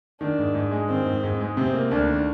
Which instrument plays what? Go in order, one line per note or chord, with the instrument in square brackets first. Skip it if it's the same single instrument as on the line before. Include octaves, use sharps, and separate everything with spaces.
[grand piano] D#3 [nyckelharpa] D4
[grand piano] G#2
G#2
G#3
[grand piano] D#3 [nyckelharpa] C4
[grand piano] G#2
G#2
G#3
[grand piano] C3 [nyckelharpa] C4
[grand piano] A#3
[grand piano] D2 [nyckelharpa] D4
[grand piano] D#3